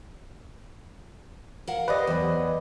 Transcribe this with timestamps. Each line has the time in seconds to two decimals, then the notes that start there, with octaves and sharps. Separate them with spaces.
1.67 A#4 F5 F#5
1.88 G4 B4 C5 D5 D#5
2.07 E2 F#3